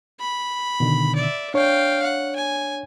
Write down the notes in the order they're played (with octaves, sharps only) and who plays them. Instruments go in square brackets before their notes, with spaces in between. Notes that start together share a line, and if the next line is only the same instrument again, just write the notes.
[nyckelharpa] B5
[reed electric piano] B2 D3 D#3
[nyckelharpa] D5 E5
[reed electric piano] D4 C#5 [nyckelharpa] F5 G5
[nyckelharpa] F#5
G#5